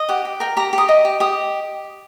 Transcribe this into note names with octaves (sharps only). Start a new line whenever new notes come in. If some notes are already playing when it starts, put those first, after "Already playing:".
Already playing: D#5
G4 F#5
G4
A#4 G5
G4 A#5
G4 D#6
D#5
G4
G4 D#6